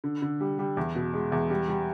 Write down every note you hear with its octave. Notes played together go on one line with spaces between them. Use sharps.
D3
D3
G3
G3
E2
B2
G#3
E2
G3
G3